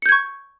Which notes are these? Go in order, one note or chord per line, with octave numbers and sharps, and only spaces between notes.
C#6 G6 G#6 C#7